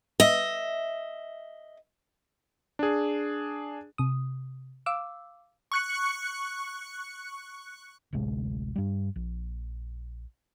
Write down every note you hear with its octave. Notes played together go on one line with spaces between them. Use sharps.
D#5 E5
D4 G#4
C3 D#6
F5 D6 E6
C#6 F#6 C#7
D1 A1 C3 G#3
G2 G3
A#1